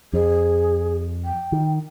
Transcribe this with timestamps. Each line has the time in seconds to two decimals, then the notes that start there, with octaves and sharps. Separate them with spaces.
0.13 F2 G#4
1.25 G5
1.52 D#3